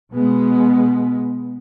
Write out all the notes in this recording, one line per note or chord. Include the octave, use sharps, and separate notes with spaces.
B2 G#3 B3